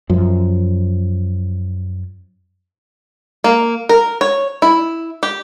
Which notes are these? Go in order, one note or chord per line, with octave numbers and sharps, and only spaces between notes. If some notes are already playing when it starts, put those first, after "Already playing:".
F#2 F3
A#3
A#4
C#5
E4
G4